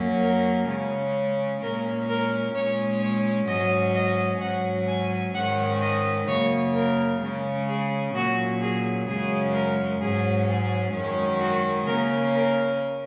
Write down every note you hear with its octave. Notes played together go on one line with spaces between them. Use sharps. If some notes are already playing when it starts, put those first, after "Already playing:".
Already playing: F#2 F#3 A#3 C#4
A#4
C#3 G#3 C#4
A#2 G#3 C#4 A#4
A#4
A#2 G#3 C#4 C#5
C#5
G#2 F#3 C#4 D#5
D#5
G#2 F#3 C#4 F#5
G#5
G#2 D#3 G#3 C#4 F#5
D#5
F#2 C#3 A#3 C#5
A#4
C#3 G#3 C#4
G#4
A#2 F#3 C#4 F#4
G#4
F#2 C#3 G#3 C#4 G#4
A#4
G#2 F#3 C#4 G#4
G#4
F#2 D#3 G#3 C#4
F#4
C#3 A#3 C#4 A#4
A#4